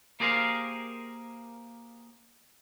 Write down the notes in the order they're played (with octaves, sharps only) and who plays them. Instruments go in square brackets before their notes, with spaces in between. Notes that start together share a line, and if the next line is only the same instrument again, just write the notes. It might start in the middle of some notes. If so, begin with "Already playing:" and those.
[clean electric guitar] A#3 G4 G#4 A#4 C5 F5